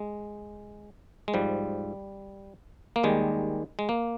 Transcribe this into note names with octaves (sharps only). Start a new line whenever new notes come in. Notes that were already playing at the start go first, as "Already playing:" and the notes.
Already playing: G#3
G#3
G#2 F3 G3
A#3
D#2 D#3 G3 G#3
G#3
A#3